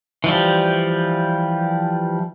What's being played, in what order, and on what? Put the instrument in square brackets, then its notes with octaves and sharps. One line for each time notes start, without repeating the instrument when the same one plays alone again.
[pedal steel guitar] E3 F3 G3